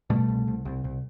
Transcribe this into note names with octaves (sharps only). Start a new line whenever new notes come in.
B2 G3 A3
C2
C2
C2
C2